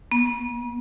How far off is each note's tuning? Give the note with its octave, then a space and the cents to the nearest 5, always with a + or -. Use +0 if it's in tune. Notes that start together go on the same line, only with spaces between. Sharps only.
B3 -45